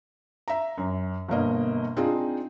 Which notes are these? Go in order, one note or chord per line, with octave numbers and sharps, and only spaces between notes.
E5 A#5
F#2
G1 B2 A#3 D#5
C4 D4 D#4 F4 G#4